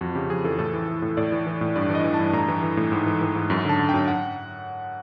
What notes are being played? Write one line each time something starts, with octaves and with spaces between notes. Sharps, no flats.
F2 F#4
C#3 G4
F2 G#4
E3 A4
A2 A4
E3
E3
A2
A2 D5
E3
E3
A2
G2 D5
E3
D#5
E3
G2 A5
A2 A#5
E3
E3
A2
G#2
E3
E3
G#2
F#2
D3 A5
D3
F#2 G5
F#5